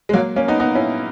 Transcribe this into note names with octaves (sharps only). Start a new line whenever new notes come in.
G#3
F#3 A#3
A#3 C#4
B3 D#4
B3 D#4
C#4 E4